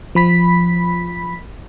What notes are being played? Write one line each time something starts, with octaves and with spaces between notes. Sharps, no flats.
F3 B5 B6